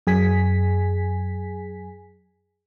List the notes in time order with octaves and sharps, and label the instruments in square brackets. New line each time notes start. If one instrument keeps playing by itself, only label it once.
[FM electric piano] F#2 G#4 G#5 B6